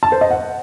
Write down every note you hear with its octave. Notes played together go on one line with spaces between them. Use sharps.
A5
C5
D#5
F#5